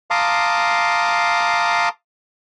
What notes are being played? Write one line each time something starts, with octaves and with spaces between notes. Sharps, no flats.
F5 A5 A#5 C6 D6 D#6